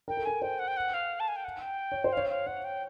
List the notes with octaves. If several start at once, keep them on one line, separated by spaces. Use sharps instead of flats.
A#4 G5
A4
A#4 G#5
C5 G5
F#5
G5
F#5
F5
A5
G#5
G5
F#5
G5
C#5
C5
C#5 F5
F5
C#5 F#5
G5